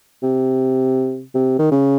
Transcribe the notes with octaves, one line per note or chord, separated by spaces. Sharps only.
C3
C3
D#3
C#3